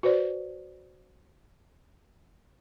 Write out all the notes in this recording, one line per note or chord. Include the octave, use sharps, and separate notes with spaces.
F#4 B4 C5 D5